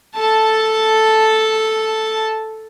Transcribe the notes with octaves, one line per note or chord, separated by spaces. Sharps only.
A4 A5